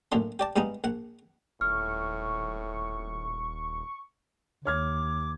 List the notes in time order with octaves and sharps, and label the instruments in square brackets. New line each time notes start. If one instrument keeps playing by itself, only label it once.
[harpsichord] A1 F#2 A#2 D3 C6
G4 D5 A5
G2 G3 G#3 B3 D#4
A#1 F#5
[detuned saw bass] D#1 [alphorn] A2 [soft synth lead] C#6 [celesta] F6
[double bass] D#2 [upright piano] C#5 F6 G#6 [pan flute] D6